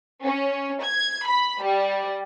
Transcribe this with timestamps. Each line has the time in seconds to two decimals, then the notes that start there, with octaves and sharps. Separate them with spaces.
0.24 C#4
0.83 G#6
1.27 B5
1.63 G3